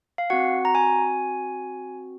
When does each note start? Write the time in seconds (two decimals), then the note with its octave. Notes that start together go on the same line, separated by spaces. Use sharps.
0.18 F5
0.30 C4 F#4 F#5
0.65 A#5
0.75 G#5